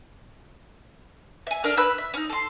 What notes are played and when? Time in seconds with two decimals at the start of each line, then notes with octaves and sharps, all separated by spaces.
1.47 E5 G#5
1.64 D4 A4 A#4 F6
1.77 B4 B5 E6 F#6
1.98 E5
2.14 C#4 D#4
2.30 A4 C6